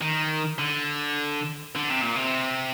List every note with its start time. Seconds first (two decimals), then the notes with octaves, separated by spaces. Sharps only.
0.01 D#3
0.59 D3
1.75 D3
1.89 C3
2.01 A#2
2.15 C3